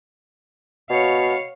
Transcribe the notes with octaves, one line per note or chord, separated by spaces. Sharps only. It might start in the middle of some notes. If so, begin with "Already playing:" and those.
B2 C#5 F5